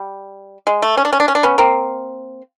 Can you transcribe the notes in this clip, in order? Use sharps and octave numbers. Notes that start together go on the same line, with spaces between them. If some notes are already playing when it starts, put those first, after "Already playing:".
Already playing: G3
G#3
A3
C#4
D4
C#4
D4
C#4
D4
B3 C#4
A#3 C4